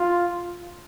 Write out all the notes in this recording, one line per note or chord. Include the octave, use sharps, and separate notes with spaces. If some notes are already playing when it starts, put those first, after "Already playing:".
Already playing: F4